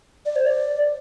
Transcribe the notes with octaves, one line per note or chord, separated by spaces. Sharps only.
D5
C5
D5